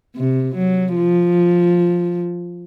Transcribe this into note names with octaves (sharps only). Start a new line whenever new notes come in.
C3
F#3
F3